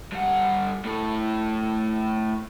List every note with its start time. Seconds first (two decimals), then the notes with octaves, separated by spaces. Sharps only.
0.12 G2 F#5
0.85 A2 A4